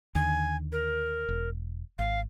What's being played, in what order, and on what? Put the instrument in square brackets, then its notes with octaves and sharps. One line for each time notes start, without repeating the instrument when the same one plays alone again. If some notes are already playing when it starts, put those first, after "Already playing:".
[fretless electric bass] D#2 D3 [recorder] G#5
[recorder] A#4
[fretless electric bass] E1
[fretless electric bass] G#1 [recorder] F5